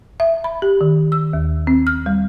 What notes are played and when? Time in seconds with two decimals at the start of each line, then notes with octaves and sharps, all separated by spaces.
0.20 E5
0.44 B5
0.62 G4
0.81 D#3
1.12 E6
1.33 D#2
1.67 C4
1.87 F6
2.06 G3